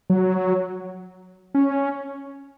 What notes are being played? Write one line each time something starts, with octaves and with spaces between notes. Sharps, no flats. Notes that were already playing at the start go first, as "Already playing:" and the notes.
F#3
C#4